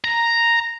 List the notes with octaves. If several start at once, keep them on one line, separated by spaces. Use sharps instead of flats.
A#5